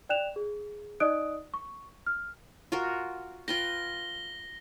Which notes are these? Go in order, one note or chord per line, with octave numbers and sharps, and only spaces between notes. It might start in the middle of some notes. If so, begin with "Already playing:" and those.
D5 G5 F#6 E7 F7
G#4
D#4 D5 D#5 D#6 F#6 D7
C#6
F6
F4 F#4 A#4
F4 B4 G5 A#6 G7